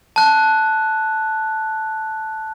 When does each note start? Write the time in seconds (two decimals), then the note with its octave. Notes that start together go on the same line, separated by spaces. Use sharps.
0.16 A5 F#6